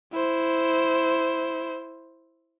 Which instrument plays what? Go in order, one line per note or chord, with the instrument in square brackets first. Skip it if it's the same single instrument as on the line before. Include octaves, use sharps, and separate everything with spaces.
[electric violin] E4 C5